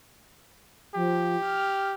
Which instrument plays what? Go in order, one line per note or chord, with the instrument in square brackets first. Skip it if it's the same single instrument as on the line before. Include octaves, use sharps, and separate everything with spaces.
[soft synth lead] F3 [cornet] G4
[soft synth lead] F6